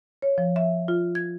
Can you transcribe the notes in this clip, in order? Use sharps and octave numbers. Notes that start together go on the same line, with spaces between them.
C#5
F3
E5
F4
G#6